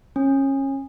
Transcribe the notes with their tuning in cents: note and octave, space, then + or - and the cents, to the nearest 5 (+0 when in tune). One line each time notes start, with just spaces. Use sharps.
C#4 -25